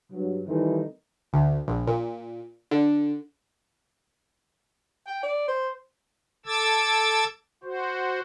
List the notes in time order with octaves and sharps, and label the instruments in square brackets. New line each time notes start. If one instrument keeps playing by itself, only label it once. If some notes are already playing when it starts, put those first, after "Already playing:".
[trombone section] G2 F#3
D#3 E3 G3 A3 C4 D#4
[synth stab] D2
A#1
A#2
D3
[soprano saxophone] G5
D5
C5
[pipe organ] A4 D6 E6 G#6 A6
F#4 C5